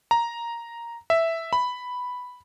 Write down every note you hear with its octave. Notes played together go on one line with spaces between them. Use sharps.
A#5
E5
B5